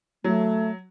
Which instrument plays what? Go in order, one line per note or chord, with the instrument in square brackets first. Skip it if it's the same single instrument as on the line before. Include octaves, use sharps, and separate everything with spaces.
[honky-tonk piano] F#3 [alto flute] A3